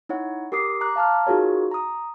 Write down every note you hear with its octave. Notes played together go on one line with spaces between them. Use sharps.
D#4 E4 C#5 F#5
G4 A#4 D6 D#6 C7
A#5 D6 F#6
F5 A5 A#5 F6
D#4 F4 F#4 G#4 A#4 C#5
A#5 D#6